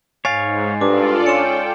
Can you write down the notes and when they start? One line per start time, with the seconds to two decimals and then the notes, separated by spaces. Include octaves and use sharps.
0.25 G#2 C#5 F5 G#5 A6 C7
0.81 G2 D4 F4 A4 D5 D6
1.26 C#4 G5 C#7 E7